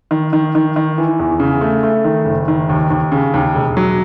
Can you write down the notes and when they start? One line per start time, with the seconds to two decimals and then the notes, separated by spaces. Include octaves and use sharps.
0.11 D#3
0.33 D#3
0.55 D#3
0.76 D#3
0.98 E3
1.19 E2
1.40 C#3
1.61 A3
1.83 A3
2.04 D#3
2.25 F#1
2.48 D#3
2.69 D#2
2.90 D#2
3.12 C#3
3.34 D#2
3.55 E1
3.77 F#3